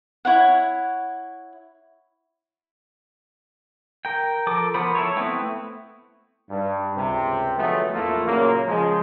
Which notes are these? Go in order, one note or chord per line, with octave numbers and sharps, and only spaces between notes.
E4 C#5 F#5
A#4 G5
F3 A4 A#4 D6
F3 B3 A#4 C5 B5
E4 A4 C#5
A3 B3 C4 E4
G2
C#2 C3
D3 F3 F#3 G#3 A3 B3
A1 E2 A3 A#3 E4 F4
A#2 C#3 F#3 A#3
C#3 F3 G#3